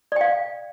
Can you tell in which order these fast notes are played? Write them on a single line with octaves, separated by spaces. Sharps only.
D5 G5 F5